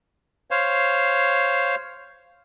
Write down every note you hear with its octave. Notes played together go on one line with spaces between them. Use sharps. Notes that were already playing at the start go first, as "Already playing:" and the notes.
C5 C#5 F5